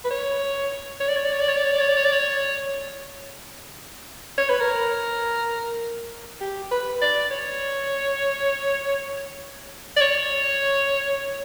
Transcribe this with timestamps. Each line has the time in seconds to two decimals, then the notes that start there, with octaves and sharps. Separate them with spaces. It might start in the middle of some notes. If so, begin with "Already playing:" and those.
0.05 B4
0.11 C#5
1.00 C#5
1.08 D5
1.16 C#5
1.25 D5
1.33 C#5
1.41 D5
1.48 C#5
1.56 D5
1.65 C#5
1.72 D5
1.81 C#5
1.88 D5
1.97 C#5
2.05 D5
2.12 C#5
4.38 C#5
4.49 B4
4.61 A#4
6.41 G4
6.71 B4
7.02 D5
7.31 C#5
9.97 D5
10.01 C#5